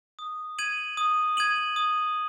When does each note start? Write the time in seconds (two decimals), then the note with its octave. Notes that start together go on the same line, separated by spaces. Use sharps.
0.19 D#6
0.59 G#6 D#7 F#7
0.97 D#6
1.37 G#6 D#7 F#7
1.76 D#6